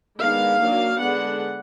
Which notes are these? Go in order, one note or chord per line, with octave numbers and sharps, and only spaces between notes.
D#3 G#3 B3 D4 F5
F#3 A#3 D4
D3 G#3 B3 D4 F#5